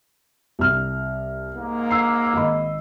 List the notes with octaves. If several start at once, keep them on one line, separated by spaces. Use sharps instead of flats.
C2 F6
G#2 A#3
E6 C7
G#1 D#5 B5